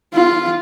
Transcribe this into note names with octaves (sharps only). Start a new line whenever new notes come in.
F4